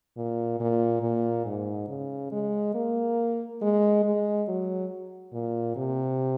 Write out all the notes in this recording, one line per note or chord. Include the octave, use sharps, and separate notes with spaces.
A#2
A#2
A#2
G#2
C#3
G#3
A#3
G#3
G#3
F#3
A#2
C3